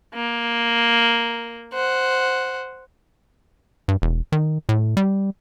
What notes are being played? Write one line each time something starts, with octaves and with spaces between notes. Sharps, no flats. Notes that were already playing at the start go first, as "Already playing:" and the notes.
A#3
C5 F#5
G2
E1
D#3
A2
G3